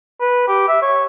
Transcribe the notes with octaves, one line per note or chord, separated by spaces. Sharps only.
B4
G4
E5
C#5